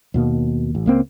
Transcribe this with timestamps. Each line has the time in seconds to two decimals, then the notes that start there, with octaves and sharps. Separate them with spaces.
0.14 D#2 B2 A#3
0.75 A1
0.86 C#2 A#3 C4